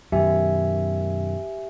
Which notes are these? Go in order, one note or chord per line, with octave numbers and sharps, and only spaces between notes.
F#2 B2 D#3 G4 E5 G#5